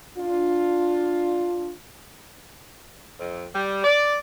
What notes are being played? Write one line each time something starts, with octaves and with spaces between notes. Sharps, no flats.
D4 F4
F2
G3
D5